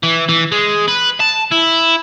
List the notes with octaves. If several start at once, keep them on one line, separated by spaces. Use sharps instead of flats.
E3
E3
G#3
B4
A5
E4